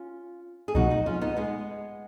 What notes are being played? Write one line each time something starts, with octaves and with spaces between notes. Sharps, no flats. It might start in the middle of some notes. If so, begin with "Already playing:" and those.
Already playing: C#4 F4
G#4
C#2 B2 F#3 D#4 F#4
D#4 F#4
C#4 F4
B3 D#4
G#3 B3